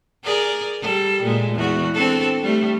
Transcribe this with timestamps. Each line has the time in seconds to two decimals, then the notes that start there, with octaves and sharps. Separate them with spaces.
0.24 G#4 A#4 D5
0.82 G3 A4
1.23 A#2 G#3
1.54 E2 F#4
1.94 C4 D4 A4
2.43 G3 A3